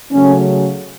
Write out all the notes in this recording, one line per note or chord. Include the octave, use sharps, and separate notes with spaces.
C#3 F#3 A3 C#4